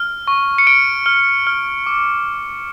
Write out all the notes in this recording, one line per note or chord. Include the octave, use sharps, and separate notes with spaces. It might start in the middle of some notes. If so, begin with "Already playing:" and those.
Already playing: F6
C#6
C#7
F6 D7
F6
F6
D6